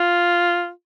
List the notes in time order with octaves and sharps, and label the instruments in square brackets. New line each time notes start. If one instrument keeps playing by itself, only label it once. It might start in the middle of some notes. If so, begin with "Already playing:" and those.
Already playing: [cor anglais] F4